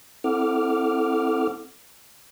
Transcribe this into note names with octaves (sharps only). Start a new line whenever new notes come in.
C4 E4 A4 F#5 D6 F6